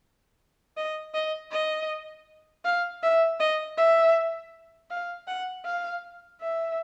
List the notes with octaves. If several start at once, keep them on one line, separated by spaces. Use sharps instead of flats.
D#5
D#5
D#5
F5
E5
D#5
E5
F5
F#5
F5
E5